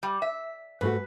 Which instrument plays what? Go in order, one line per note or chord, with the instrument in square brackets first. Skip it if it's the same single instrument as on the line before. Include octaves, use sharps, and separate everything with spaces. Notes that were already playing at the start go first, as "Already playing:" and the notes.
[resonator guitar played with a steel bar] G3
E5
[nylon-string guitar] G#2 A3 F#4 [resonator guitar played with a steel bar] B4